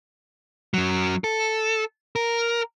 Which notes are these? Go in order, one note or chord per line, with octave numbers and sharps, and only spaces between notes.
F#2 F#3
A4
A#4